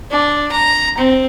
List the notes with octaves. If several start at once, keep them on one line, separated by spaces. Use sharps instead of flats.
D4
A#5
C4